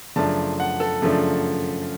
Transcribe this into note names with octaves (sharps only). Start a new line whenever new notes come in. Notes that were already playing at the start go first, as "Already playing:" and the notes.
F#2 C#3 F3 A3 D4 A5
F#5
A4
F#2 C#3 F3 A3 D4